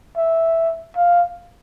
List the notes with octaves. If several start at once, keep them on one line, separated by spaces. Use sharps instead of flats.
E5
F5